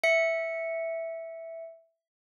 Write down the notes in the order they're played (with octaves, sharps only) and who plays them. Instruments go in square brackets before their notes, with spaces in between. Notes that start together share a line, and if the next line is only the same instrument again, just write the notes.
[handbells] E5 C#7